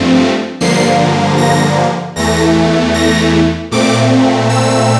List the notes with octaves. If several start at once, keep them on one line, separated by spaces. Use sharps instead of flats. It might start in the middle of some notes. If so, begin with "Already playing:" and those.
Already playing: G2 F3 A3 C4
G2 D3 F3 A#3 C7
A#6
E2 E3 A3 A#6
A#6
A#2 A3 C4 D6
E6